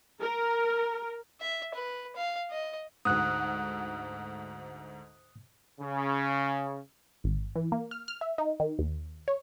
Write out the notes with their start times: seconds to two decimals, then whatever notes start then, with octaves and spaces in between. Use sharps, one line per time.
0.21 A#4
1.41 E5
1.74 B4
2.16 F5
2.51 D#5
3.05 D2 G#2 D#6 F#6
5.80 C#3
7.24 G#1
7.56 E3
7.72 A#3
7.91 F6
8.08 F6
8.21 E5
8.38 D#4
8.60 D#3
8.79 D#2
9.28 C#5